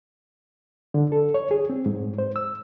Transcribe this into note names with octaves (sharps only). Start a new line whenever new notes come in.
D3
A4
C#5
G#4
C4
G#2
C5
E6